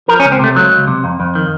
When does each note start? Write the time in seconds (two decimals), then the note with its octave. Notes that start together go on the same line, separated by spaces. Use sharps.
0.08 F3 A#4
0.20 C#4
0.24 C#2
0.32 C4
0.39 C3 A3
0.56 C#2 F#3
0.72 C#2
0.87 C3
1.04 F2
1.20 F2
1.35 D#3